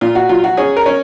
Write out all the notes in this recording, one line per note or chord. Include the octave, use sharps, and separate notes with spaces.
A#2 F4
F#4
F#3 F4
F#4
C#4 G#4
A#4
C#4